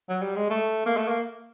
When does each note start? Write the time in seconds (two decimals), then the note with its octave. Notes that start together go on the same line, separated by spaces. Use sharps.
0.09 F#3
0.22 G3
0.36 G#3
0.50 A3
0.86 A#3
0.97 A3
1.08 A#3